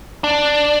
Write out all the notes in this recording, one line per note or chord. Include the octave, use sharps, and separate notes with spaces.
D4